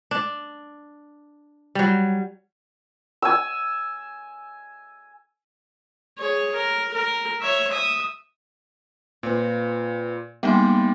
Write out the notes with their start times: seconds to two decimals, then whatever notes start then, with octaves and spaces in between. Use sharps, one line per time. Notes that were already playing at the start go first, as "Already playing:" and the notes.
0.11 D4
1.75 F#3 G3
3.22 G#5 E6
6.19 G#4 C#5
6.55 A#4
6.94 A#4
7.41 C#5 E5
7.71 E5 D#6
9.23 A#2 C4 F4 B4
10.43 G3 G#3 A#3 B3 D#4 G5 C6 A6